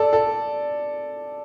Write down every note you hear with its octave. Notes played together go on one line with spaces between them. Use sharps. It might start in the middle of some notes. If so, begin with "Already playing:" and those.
Already playing: A4 D5
A4